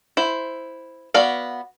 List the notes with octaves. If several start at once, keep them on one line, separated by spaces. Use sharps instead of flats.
E4 C5
B3 F#4 D5 F5